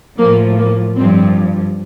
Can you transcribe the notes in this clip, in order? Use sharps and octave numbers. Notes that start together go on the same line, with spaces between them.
A2 F3 A#3
A#3
G2 F3 C4